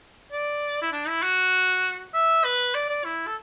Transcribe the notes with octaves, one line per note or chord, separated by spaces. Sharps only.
D5
E4
D4
E4
F#4
E5
B4
D5
D5
E4
A4